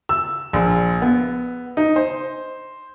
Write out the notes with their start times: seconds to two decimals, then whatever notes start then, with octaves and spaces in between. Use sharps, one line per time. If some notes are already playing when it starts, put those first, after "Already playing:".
0.09 E6
0.53 A#1
1.02 B3
1.77 D#4
1.96 C5